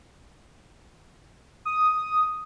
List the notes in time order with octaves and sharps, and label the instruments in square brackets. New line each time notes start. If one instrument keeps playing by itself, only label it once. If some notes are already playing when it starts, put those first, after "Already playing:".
[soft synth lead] D#6